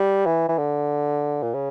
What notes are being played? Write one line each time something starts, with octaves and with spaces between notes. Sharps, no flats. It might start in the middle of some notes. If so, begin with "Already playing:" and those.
Already playing: G3
E3
E3
D3
A#2
C#3